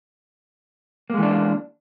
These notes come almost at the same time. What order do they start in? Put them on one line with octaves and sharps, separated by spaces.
A#3 G#3 E3 D4